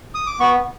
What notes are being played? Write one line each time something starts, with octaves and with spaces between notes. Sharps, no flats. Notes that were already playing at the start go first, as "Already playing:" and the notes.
D#6
D6
B3 C#6